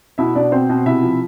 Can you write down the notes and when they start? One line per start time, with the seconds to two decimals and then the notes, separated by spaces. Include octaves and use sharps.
0.18 B2 E4 E5
0.35 B2 D4 D5
0.52 B2 C4 C5
0.70 B2
0.86 C3 E4 E5
1.03 F3